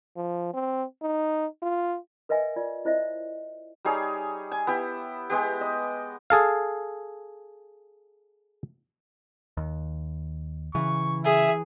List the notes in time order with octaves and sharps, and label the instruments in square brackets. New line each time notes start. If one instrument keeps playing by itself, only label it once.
[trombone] F3
C4
D#4
F4
[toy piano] A#4 B4 D#5 E5 G#5
F4 D5
E4 C5 D#5 E5
[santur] G3 D#4 G#4 C#5
G#5
B3 E4 G4
G#3 B3 G4
D#5
[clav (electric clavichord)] G#4 A4 F5
[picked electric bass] D#2
[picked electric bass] C#3 [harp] E3 [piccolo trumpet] C#6
[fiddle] G#4 [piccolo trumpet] E5